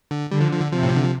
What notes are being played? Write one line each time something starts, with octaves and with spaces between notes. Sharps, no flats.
D3
D3 G3
F3
F3
D3
C3 F3
A2
C3
D3
F3